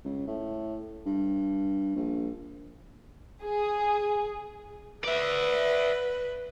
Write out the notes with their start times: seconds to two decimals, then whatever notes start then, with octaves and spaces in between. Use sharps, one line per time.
0.05 C#2
0.27 A2
1.06 G2
1.96 A#1
3.42 G#4
5.04 B4 D5 E5